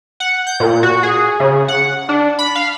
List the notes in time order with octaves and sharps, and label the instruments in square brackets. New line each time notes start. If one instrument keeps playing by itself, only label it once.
[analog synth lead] F#5
G6
A#2
F#4
G#4
C#3
F#5
D4
B5
F5